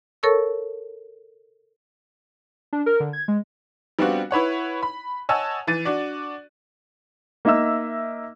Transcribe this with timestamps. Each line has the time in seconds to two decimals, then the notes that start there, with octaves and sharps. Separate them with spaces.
0.23 A4 A#4 C#5 A5 C#6 E6
2.73 D4
2.86 A#4
3.00 D3
3.13 G#6
3.28 G#3
3.99 G3 B3 C4 D4 F4 F#4
4.31 E4 B4 C#5 F#5
4.82 B5
5.29 C#5 D#5 F#5 G#5 A5 E6
5.67 E3 A6 D#7
5.85 D4 F#4 D5
7.45 A#3 D#4 E5 E6